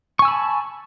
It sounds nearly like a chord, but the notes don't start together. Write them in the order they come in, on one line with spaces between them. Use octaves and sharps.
C#6 G#5 E6 B5 A5